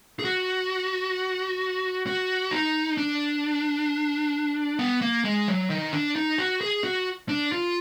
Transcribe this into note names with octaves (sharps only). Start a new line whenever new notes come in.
G#4
F#4
F#4
D#4
D4
B3
A#3
G#3
F#3
D#3
D4
D#4
F#4
G#4
F#4
D4
F4